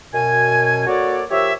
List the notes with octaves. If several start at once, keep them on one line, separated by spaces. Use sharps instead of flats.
F#2 B2 G#5
A#3 F#4 A4 C#5 D5
F3 G4 A#4 C#5 E5